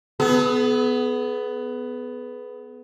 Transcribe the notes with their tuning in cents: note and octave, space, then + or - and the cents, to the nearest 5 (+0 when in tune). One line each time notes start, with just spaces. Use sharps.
B3 +10 G#4 +40